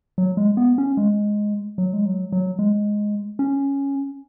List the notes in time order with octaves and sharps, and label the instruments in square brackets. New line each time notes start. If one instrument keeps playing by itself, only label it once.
[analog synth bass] F#3
G#3
B3
C#4
G#3
F#3
G#3
F#3
F#3
G#3
C#4